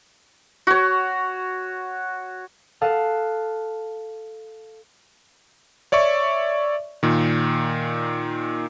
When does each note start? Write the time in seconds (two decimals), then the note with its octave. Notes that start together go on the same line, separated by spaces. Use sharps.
0.67 F#4 C#5
2.81 A4 F5 A5 D#6 F#6
5.92 C#5 D5 E5 C#6
7.03 A#2 D#3